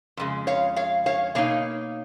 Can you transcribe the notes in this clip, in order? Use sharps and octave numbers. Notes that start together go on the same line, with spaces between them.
F2 C#3 G#3
C#5 F5
C#5 F5
C#5 F5
B2 A#3 D#4 C#5 F5